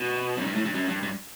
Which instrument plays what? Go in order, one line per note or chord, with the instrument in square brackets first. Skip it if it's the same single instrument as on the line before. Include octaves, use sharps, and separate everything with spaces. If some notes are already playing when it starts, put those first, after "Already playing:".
Already playing: [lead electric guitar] B2
F#2
G2
A2
G2
F#2
G2
G2